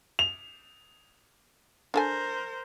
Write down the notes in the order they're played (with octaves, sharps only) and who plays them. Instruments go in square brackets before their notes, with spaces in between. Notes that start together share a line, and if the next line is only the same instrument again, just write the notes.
[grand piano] F7
[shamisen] D4 A4 G#5 [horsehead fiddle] A#4 C5